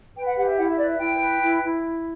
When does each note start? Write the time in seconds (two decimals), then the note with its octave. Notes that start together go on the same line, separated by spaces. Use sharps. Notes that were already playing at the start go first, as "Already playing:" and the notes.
0.15 B4 G5
0.25 F#5
0.36 G4 F#5
0.46 E5
0.56 E4 F#5
0.67 E5
0.77 B4 D5
0.88 E5
0.99 E4 G5
1.19 B4
1.40 E4
1.61 E4